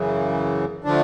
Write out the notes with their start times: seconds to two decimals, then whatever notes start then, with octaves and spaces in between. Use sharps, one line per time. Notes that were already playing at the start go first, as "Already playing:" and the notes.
Already playing: F#2 C#3 E3
0.84 D3 F3 A3 D4